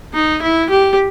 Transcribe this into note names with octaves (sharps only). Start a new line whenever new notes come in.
D#4
E4
G4